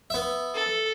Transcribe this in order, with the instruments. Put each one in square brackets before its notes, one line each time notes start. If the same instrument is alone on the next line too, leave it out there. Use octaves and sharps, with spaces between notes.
[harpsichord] B3 E5
[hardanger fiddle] A4